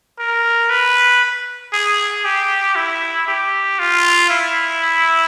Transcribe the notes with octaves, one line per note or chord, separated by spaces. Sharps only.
A#4
B4
G#4
G4
E4
G4
F4
E4